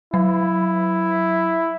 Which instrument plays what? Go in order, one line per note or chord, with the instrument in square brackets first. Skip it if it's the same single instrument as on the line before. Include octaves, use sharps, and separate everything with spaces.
[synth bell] F#3 [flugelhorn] E4